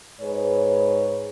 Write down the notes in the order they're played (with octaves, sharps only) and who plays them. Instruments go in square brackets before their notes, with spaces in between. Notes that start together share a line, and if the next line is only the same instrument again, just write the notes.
[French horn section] G#2 G#4 B4 C#5